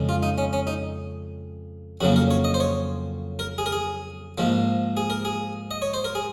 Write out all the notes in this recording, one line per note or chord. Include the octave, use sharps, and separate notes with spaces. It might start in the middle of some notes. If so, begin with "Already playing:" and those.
Already playing: F2 C#3 G#3
F4
D#4
C#4
C#4
D#4
F2 C#3 F#3 A#3 F#4
A#4
C#5
D#5
C5
C#5
A#4
G#4
A#4
G#4
G#2 F3 A#3
G#4
A#4
G#4
D#5
C#5
C5
A#4
G#4